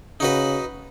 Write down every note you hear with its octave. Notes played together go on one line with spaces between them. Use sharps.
C#3 D#4 F#4 B4